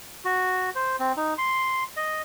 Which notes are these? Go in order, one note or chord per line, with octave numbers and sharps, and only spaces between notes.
F#4
C5
C4
D#4
C6
D#5